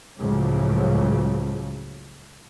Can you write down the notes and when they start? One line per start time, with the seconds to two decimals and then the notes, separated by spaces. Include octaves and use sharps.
0.20 C#2 A2 C#3 F3 F#3